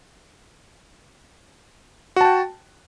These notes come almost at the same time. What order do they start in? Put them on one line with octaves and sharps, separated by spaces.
F#4 A5 G5